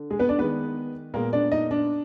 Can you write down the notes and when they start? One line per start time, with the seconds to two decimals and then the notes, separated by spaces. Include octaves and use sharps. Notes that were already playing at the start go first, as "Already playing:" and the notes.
Already playing: D3
0.10 G#3 G#4
0.19 B3 B4
0.29 D4 D5
0.38 D#3 G#3 B3 B4
1.14 A#2 G#3 A#3 B3 A#4
1.33 D4 D5
1.52 D#4 D#5
1.71 D4 D5